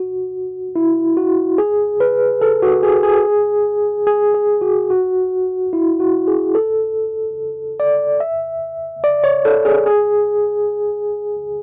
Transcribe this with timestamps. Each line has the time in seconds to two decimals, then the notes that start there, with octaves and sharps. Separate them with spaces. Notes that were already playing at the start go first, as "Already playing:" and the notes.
Already playing: F#4
0.76 E4
1.17 F#4
1.58 G#4
2.00 B4
2.42 A4
2.62 F#4
2.83 G#4
3.03 G#4
4.07 G#4
4.35 G#4
4.61 F#4
4.90 F#4
5.73 E4
6.00 F#4
6.28 G#4
6.55 A4
7.80 D5
8.20 E5
9.04 D5
9.24 C#5
9.45 A4
9.65 G#4
9.86 G#4